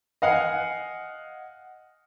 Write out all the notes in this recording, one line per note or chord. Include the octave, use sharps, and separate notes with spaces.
D#5 F5 F#5 G#5